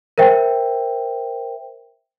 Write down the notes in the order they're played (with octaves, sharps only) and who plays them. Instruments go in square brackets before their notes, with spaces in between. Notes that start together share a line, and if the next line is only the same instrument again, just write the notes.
[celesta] A#4 C5 E5 G5